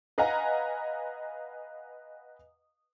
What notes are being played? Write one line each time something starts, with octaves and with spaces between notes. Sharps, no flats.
B4 D#5 F5 F#5 G#5 A#5